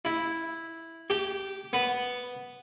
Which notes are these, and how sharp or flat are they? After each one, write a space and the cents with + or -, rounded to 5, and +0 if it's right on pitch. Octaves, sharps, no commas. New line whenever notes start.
E4 -5
G4 -15
B3 +0